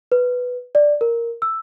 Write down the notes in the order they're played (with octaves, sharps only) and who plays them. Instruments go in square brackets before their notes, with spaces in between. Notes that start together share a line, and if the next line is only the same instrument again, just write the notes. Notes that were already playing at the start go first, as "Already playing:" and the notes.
[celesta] B4
D5
A#4
E6